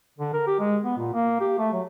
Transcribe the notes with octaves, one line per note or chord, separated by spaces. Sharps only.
D3
A#4
G4
G#3
B3
A#2
A#3
G4
A3
F#3